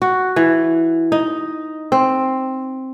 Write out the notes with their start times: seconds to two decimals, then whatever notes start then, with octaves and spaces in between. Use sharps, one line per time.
0.02 F#4
0.36 E3
1.12 D#4
1.92 C4